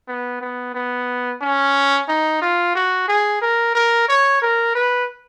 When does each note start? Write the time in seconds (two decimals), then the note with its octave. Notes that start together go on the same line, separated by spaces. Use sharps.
0.08 B3
0.41 B3
0.75 B3
1.42 C#4
2.09 D#4
2.42 F4
2.75 F#4
3.08 G#4
3.42 A#4
3.75 A#4
4.09 C#5
4.42 A#4
4.75 B4